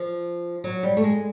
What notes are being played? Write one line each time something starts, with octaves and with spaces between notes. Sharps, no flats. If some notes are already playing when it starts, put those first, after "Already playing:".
Already playing: F3
F#3
G3
A3
G#3